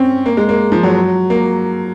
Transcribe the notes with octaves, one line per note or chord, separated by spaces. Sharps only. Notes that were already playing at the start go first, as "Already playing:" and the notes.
Already playing: C4 C#4
A#3
G#3
A#3
F3
F#3
A#3